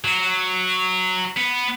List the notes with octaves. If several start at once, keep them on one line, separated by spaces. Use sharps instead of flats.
F#3
B3